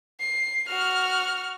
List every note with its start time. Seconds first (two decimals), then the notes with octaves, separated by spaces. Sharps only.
0.21 C7
0.69 F#4 F6